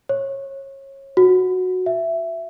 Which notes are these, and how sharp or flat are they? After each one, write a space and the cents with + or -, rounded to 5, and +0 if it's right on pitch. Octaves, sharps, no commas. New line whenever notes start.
C#5 -25
F#4 -10
E5 +10